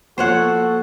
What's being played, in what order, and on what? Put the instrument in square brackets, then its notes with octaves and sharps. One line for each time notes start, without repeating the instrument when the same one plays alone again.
[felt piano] F3 A#3 [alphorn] F#4 [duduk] A4 [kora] C5 C#5 F#5